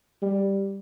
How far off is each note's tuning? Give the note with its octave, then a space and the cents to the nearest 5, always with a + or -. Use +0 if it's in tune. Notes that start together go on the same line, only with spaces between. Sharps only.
G3 +5